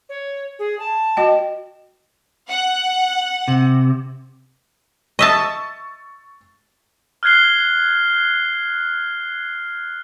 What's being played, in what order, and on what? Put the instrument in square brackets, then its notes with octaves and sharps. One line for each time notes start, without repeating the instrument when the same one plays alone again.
[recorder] C#5
G#4
A5
[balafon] F#4 D#5 G5
[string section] F#5
[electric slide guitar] C3
[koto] D#5 E5 A5 [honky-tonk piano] C#6 E6 A6
[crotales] F6 F#6 G#6 C7 G7